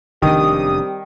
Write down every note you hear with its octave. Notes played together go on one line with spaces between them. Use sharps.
F1 E2 D#3 G3 C4 D4 G4 D#6